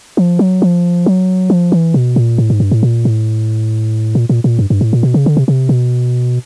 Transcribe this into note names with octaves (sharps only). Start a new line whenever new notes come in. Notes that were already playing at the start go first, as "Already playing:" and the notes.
F3
F#3
F3
F#3
F3
E3
B2
A#2
A2
G#2
G2
A2
A#2
A2
A#2
A#2
A#2
G2
G2
A2
A#2
B2
C#3
D3
C3
C3
B2